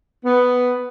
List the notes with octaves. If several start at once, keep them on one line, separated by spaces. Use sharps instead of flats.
B3